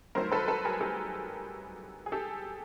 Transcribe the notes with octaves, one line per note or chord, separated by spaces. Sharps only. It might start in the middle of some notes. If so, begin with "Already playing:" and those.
G2 D#3 F#3 A3 A#4 C5
A4 B4
A4 B4
G#4 A#4
G4 A4
G#4
G4 A4